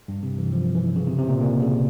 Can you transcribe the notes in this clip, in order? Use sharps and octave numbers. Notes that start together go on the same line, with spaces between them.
G2
C3
E3
F3
E3
C#3
C3
C3
A#2
A#2
C#3